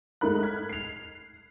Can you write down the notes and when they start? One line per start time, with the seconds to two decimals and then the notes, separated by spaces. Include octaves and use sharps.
0.21 G#2 A3 D#4 A#4 B5 F#6
0.43 F6 G#6 B6
0.69 C7 F7